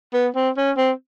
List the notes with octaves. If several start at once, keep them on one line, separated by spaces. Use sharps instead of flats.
B3
C4
C#4
C4